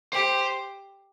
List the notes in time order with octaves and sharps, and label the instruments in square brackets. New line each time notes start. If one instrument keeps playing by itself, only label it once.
[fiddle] G4 [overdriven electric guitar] C5